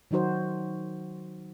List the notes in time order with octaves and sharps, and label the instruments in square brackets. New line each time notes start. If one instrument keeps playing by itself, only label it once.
[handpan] D#3 F#3 D#4 F#4 C5